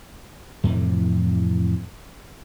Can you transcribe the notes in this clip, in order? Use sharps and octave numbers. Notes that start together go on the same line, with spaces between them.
F2 A2 C3 E3